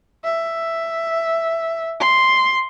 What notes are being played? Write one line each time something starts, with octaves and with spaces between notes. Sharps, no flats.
E5
C6